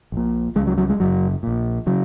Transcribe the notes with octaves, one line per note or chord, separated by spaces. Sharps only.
A#1 A#2
C#2 C#3 G#3
F#3
F#3
G#3
F#1 F#2 C#3 F#3
A#1 A#2
C#3 F#3